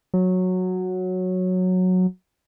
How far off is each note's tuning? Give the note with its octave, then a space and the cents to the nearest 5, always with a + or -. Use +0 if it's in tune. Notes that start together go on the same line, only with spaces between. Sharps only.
F#3 -10